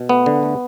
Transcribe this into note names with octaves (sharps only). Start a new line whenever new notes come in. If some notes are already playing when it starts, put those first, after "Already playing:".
Already playing: B2
A3 B3
D3
A3